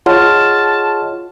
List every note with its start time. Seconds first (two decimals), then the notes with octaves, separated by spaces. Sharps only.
0.06 F4 G#4 C#5 D#5 F#5 A5 C6 F6